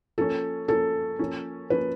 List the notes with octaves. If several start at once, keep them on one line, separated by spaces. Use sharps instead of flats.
F3 A#3 C#4 A4
F3 A#3 C#4 A4
F3 A#3 C#4
F3 A#3 C#4 B4